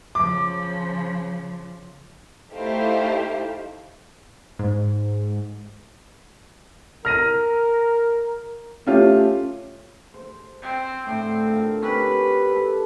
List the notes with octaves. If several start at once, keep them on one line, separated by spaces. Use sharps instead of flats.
C#3 F3 D6
A3 D#4 E4 G4 C5 F5
G#2
A#4 F6 A#6 D#7
A3 C#4 F4 G4
C5
C4
A2 D3 C4
F4 A#4
C4 C#4 G4 B4
A4 C5